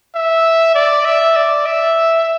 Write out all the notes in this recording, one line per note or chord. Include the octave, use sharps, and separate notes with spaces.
E5
D5
E5
D5
E5